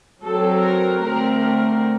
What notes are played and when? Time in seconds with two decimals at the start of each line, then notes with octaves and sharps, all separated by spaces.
0.23 F#3 C4 A4
0.62 A#4
1.01 D3 A3 C4 A#4
1.40 A#4